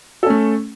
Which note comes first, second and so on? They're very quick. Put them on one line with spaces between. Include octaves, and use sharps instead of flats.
A4 C#4 A3